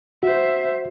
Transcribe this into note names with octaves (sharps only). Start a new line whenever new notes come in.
F#4 C5 E5